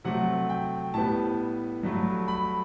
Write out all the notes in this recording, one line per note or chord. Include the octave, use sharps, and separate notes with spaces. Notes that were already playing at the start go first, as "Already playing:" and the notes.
C3 F#3 A3 F#5
G5
A2 G3 B3 A5
G2 F#3 A3
B5